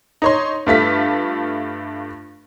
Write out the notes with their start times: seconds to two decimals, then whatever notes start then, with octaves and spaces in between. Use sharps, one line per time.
0.22 D#4 C#5 C6
0.67 G2 A3 F4 B6